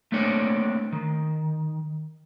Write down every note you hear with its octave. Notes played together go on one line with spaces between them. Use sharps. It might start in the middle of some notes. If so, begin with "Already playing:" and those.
A3 A#3 C4 D4 C#5
D#3